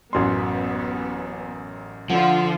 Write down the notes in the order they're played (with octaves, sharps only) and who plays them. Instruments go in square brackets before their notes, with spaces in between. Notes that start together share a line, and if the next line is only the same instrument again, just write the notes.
[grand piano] A1 F#2 C6 [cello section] B3
[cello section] D3 F4 [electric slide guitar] F3 [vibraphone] F#5